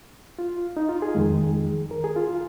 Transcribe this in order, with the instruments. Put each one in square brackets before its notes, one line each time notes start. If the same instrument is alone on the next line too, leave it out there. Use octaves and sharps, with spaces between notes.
[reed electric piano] F4
D#4
F4
G#4
F2 D#3 G#3
A#4
G#4
F4
F4